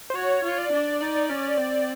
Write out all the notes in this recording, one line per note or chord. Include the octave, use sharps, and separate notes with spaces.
C5
F#4 C#5
F4
D5
D4
D#4 D5
C#4
C4